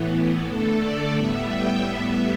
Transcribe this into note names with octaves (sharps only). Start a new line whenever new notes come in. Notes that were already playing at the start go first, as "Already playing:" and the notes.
Already playing: A2 E3 B3
D3 A3 A4
D5
A2 G3 B3 E5
G5
A2 G3 B3 E5